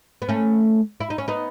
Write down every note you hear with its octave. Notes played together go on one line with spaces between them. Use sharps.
B3
A3 C#4
E4
D#4
C#4
B3 D#4